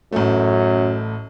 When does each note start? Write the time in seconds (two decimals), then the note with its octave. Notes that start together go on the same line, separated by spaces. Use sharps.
0.12 A1 F#2 A3